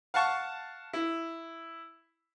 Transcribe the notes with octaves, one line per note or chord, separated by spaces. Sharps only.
F5 F#5 A5 C#6
E4